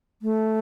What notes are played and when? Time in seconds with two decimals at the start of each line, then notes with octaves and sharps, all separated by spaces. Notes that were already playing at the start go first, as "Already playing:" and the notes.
0.22 A3